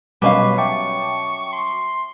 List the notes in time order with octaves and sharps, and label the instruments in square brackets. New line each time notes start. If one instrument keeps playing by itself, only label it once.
[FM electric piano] B2 G3 [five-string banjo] F#3 C#4 F5 [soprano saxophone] B4 [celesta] D#5 D6
[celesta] E5 [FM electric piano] G5 A5 D6 [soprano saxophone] C#6
[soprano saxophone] C6